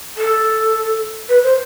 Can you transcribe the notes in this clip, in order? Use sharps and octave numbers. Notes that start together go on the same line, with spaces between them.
A4
B4
C5